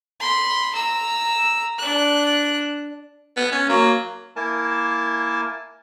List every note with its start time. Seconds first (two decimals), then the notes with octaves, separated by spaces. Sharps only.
0.20 B5 C6
0.74 A#5 E6
1.79 D4 F#6
3.37 B3
3.52 C#4
3.69 F#3 A#3
4.36 A#3 E4 A#4 G#5 A5